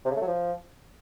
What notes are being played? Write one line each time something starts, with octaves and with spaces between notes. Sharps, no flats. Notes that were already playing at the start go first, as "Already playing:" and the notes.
C3
C#3
A3
F#3
F3